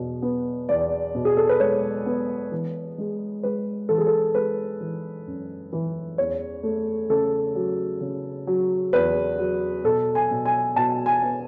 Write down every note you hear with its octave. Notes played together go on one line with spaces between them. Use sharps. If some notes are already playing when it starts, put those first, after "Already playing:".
Already playing: E2 B2
B3
E2 D5
B2
G#4
A4
B4
G#3 C#5
B3
E3
G#3
G#3 B4
E3 A4
G#4
A4
G#3 B4
E3
F#2
E3
E2 C#5
A3
C#3 A4
F#3
C#3
F#3
E2 B4
F#3
B2 A4
G#5
B2
G#5
B2 A5
G#5
B3